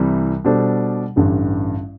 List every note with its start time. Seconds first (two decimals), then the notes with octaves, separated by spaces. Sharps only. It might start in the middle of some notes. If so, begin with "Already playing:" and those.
Already playing: C2 C3 E3 G3
0.44 B2 G3 D4 A4 C5
1.16 A1 G2 D3 G3